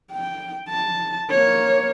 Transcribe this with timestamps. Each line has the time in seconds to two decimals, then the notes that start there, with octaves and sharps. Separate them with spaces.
0.12 G5
0.69 A5
1.30 A#3 C#5